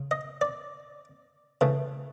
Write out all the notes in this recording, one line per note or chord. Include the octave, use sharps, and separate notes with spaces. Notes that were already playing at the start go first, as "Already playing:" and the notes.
Already playing: C#3
D#5
D5
C#3 E3 A3